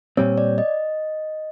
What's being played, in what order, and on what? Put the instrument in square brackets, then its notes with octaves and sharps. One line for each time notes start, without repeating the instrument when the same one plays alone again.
[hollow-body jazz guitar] A#2 G3 C4 [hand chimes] C#5
[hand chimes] D5
D#5